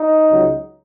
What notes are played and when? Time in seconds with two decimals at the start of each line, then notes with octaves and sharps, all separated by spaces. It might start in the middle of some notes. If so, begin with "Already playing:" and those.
Already playing: D#4
0.30 C#2 C#3 F#3